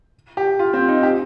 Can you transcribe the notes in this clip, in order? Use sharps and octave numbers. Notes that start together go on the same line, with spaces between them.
G4
F4
C4
D#4
G4